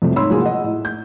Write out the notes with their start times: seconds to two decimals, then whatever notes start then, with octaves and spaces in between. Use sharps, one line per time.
0.02 F2 C3 F#3 G3 A3
0.16 G#2 D#4 C#5 B5 C6 E6
0.29 F3 F#3 G#3 A#3 G#4
0.41 D#5 F#5
0.64 A2
0.85 G6